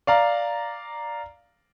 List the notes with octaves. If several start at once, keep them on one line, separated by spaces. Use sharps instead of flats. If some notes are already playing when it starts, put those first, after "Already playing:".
D5 F5 A#5